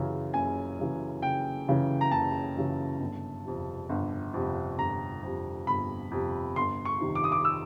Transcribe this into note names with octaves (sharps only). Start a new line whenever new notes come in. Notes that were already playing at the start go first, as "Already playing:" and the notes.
Already playing: F#1 F#2 C#3 E3
F#1 G#5
F#2 C#3 E3
F#1 G5
F#2 C#3 E3
A#5
F#1 A5
F#2 C#3 E3
G1
F2 C3
G1
F2 C3
G1 A#5
F2 C3
G1 B5
F2 C3
G1 C6
C#6
F2 C3 D#3
D6
D#6
D6
E6